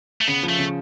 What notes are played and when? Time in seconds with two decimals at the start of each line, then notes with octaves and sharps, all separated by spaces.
0.21 A3
0.28 C#3 B3
0.43 F3
0.49 A3
0.59 C#3